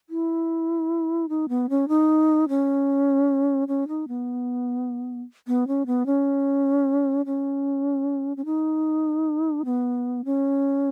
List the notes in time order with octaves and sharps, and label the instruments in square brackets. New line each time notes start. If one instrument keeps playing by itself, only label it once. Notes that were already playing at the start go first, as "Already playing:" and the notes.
[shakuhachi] E4
D#4
B3
C#4
D#4
C#4
C#4
D#4
B3
B3
C#4
B3
C#4
C#4
C#4
D#4
B3
C#4